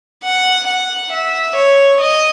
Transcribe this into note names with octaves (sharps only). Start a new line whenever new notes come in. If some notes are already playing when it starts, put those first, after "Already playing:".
F#5
F#5
E5
C#5
D#5